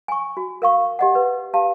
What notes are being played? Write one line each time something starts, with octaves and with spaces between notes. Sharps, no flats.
G#5 C#6
F#4
A#4 F5 C#6
G4 D#5 F#5
B4
G4 F5 A5